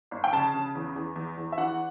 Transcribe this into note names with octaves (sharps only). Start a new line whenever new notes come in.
G1
G5
C#3 A5
C#3
E2
E2
E2
E2
E5
E3 F#5